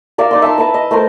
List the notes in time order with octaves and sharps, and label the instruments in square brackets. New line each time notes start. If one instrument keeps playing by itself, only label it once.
[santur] A#4 D5 E5 F5
D#4 D5 C6
E5 A5 C6
B4 D#5 E5 A5
D#5
A3 A#4 C5 C6